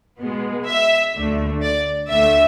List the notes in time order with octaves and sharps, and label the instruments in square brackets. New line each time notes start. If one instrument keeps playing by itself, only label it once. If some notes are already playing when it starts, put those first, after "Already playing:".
[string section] B2 G#3 B3
E5
D2 D3 A3
D5
D2 D3 A3 E5